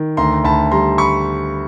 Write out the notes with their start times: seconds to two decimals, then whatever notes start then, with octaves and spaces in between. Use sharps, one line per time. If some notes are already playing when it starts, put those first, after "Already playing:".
Already playing: D#3
0.17 D2 A#5 C6
0.44 D2 A5 B5
0.71 G3 A#5 C6
0.98 B5 C#6